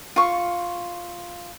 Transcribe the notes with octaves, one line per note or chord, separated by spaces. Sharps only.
F4 C#6